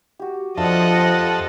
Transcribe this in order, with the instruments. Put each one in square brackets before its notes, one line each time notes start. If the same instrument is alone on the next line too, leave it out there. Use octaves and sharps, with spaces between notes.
[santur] F#4 G4
[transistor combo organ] F2 A4 [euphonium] F3 [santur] D4 F4 E5 [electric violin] D#5 F#5
[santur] C4 G5 A5